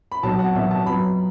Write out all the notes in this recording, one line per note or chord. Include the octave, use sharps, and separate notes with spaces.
B5
B1 B2 F#3 A5
F#5
B1 B2 F#3 E5
A5
F#2 F#3 B3 B5